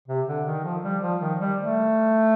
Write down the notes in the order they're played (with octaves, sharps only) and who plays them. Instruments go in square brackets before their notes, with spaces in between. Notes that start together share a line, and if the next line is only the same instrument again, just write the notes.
[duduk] C3
D3
D#3
F3
G3
F3
D#3
G3
A3